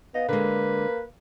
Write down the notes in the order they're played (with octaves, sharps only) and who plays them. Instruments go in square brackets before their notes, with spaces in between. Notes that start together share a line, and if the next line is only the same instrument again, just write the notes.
[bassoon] B3 [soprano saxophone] D#5 [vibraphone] F5
[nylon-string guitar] D3 G#3 [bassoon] A#3 [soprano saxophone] B4